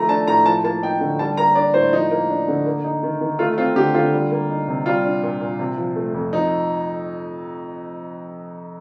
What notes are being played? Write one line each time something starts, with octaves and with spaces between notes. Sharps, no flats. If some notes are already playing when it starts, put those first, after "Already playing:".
Already playing: D#3 F3 A3 A#5
D4 A5
A2 A#5
F3 A5
A#3 A5
D#4 G5
D3
G3 A5
A#3 A#5
D4 D5
A2 C5
F3 D#4
A#3
D4
D3
A#3
D#4
D#3
D#3
A3 F4
C4 F4
D3 G4
D3 F4
G3
A#3
D#4
C3
G3 F4
D4
A#2
A#2
C3
F3
A3
F2
F3 D#4